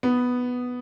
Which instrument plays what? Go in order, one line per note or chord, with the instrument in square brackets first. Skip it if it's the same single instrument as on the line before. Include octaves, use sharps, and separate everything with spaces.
[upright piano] B3